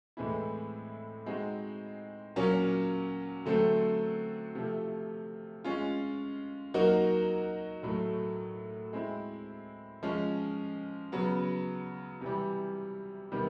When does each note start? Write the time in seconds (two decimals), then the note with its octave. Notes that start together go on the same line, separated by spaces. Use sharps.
0.17 A2 E3 G#3 C4 E4
1.26 G#3 C4 D#4 F#4
2.36 A#2 F#3 A#3 C#4
3.46 D3 F#3 A3 C4
4.55 C3 F3 A3
5.64 G#3 C#4 F4
6.74 F#3 A#3 D#4 F#4 A#4
7.83 A2 F#3 A3
8.93 G#3 C4 E4
10.03 F3 G#3 C#4
11.12 C#3 F#3 B3
12.21 C3 E3 G3
13.31 C3 D#3 G3 B3